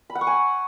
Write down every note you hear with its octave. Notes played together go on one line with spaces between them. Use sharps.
B5
F#5
C#6
G#5